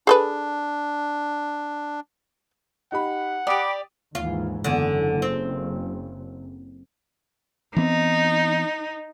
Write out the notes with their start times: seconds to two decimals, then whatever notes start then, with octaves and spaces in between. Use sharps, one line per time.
0.07 D4 G#4 A4 B4
2.92 D#4 G4 F#5 B5
3.47 G4 D5 G5 B5 D6 D#6
4.15 D#2 G#2 E3 F4
4.64 F#1 E2 D3
5.22 C4
7.76 E3 B3 C4 D#4